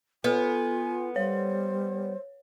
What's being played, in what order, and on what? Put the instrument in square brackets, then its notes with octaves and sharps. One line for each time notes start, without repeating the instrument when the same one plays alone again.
[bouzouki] B3 [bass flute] F4 [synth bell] A4 B4 [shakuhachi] G#5
[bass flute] G3 [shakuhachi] C5 [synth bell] C#5